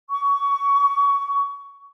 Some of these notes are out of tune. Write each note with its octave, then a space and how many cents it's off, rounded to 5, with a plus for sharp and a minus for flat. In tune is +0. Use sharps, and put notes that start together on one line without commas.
C#6 +20